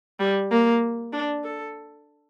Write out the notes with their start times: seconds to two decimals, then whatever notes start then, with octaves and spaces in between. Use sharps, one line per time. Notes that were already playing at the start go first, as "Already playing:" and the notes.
0.20 G3
0.51 A#3
1.13 D4
1.44 A4